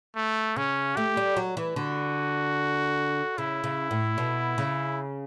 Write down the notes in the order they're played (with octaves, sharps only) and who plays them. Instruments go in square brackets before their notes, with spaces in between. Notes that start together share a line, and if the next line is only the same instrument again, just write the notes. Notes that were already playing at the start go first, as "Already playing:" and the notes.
[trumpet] A3
[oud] C#3 [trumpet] C#4
[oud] A3 [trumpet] G4
[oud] G3
F#3
E3
[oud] D3 [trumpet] F#4
[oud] C#3 [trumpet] E4
[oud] C#3
A2
B2
C#3